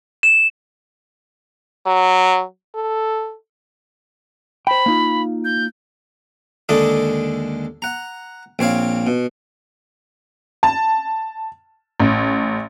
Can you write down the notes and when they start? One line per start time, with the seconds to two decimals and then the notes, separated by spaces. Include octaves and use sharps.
0.23 E7
1.87 F#3
2.75 A4
4.67 C5 G5 B5
4.86 A#3 D#4 F4
5.45 G6
6.69 D#2 D3 G#3 D4 A4 D#6
7.82 F#5 A#5
8.59 A#1 C4 C#5 F5
9.07 B2
10.63 A5
12.00 A1